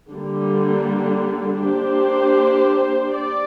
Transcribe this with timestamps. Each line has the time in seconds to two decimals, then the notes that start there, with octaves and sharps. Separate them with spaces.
0.12 D3 G3 A#3
1.63 A#3 D4 G4 C5
3.16 D5